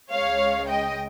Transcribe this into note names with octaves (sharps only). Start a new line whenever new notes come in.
C#2 C#3 G#3 C#5 F5
D#5 G5